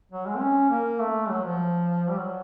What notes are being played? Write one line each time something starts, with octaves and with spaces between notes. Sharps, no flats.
F#3
G#3
C4
C#4
A#3
A3
F#3
F3
G3
F#3